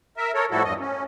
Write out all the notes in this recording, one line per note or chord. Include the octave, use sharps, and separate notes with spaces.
A#4 E5
A4 A#4 C#5
A2 F3 G3 E4 F#4 A4
E2 G2 D#5
C#4